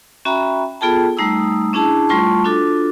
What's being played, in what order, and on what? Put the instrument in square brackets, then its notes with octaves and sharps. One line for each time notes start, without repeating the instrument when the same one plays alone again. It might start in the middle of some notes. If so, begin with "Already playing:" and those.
[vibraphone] C#4 F#4 E5 G5 A#5 B5
B3 F4 G#4 A4 G5 A5
G3 A3 D#4 A#5 D#6 E6
C#4 D4 E4 G#4 A5
G3 A3 F4 A5 C6 C#6
D4 F4 F#4 A4 D6